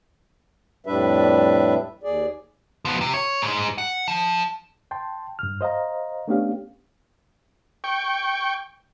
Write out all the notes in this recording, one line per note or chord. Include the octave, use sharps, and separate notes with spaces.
F2 A2 G3 D4 B4 E5
D#2 G#4 D5
F3 B3
C3
C#5
G#2 G#3
F#5
F3
G5 A5 C6
G2 F6
C5 D#5 F5 A#5
A3 B3 C#4 D4 G4 F5
G5 C#6